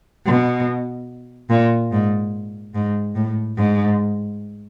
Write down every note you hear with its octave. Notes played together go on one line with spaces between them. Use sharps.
B2
A#2
G#2
G#2
A2
G#2